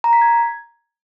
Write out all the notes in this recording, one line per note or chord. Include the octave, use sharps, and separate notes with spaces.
A#5
B6
G#6